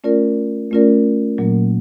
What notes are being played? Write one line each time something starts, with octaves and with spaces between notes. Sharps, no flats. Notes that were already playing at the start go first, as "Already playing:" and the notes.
A3 C#4 F4 A#4 D5
A3 C#4 F4 A#4 D5
A#2 F#3 A#3